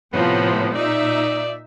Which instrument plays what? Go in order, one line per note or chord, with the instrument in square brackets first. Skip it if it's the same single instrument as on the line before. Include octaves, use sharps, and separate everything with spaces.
[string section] A2 C3 F3 [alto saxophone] B3
[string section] A#2 D#4 E5 [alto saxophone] D5